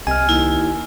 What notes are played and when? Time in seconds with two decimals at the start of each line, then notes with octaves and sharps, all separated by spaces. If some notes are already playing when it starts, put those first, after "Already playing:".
0.07 C2 C3 D#5 G#5 F6
0.29 D#2 E4